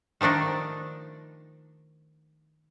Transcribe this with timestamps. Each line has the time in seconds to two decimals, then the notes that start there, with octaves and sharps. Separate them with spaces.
0.21 D#3 F3 A3 D4 D#4